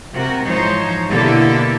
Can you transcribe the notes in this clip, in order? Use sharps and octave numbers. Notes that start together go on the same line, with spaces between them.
C3 F#4 A#4
G#2 E3 F3 D#4 C5 C#5
B2 D3 A#3 E4 G4 A4